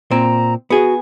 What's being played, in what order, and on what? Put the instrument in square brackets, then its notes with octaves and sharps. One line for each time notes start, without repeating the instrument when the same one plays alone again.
[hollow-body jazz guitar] A#2 C4 [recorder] A#5
[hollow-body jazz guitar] B3 G#4 [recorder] F#4